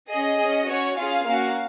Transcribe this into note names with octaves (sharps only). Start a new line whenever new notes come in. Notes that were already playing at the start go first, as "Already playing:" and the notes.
C#4 G#4 D#5
C#4 G#4
C#4 F#4 C#5
C#4 F4 G#4 F5
A#3 C#4 F#4